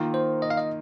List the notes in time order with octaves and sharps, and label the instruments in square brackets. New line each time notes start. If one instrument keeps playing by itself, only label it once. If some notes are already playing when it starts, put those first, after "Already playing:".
Already playing: [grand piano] D#3 A#3 F4
[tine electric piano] C5
D#5
F5
D#5